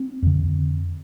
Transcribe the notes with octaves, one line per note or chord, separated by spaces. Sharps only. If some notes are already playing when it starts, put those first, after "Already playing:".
Already playing: C4
F2 D3